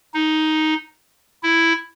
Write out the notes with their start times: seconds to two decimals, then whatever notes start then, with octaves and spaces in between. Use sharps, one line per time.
0.14 D#4
1.43 E4